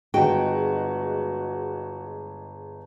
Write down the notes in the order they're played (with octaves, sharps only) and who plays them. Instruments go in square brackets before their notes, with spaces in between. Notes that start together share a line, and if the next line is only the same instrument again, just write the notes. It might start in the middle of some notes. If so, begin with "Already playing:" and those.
[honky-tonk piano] G1 G#3 [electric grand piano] F#4 [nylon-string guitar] G5